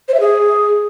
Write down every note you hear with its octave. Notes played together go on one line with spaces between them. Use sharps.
C5
E5
G#4